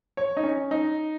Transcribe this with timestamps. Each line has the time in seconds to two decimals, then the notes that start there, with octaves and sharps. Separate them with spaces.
0.17 C#5
0.37 D#4
0.44 C#4
0.71 D#4